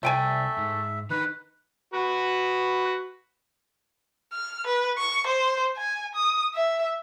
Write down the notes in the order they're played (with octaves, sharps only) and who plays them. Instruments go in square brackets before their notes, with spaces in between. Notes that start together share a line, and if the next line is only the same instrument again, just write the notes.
[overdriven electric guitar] C2 [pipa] A3 G5 G#5 [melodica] E5
[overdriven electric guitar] G#2
[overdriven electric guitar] D#3 D#4 [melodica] B4
[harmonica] F#4 B4
[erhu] F6
B4
C#6
C5
G#5
D#6
E5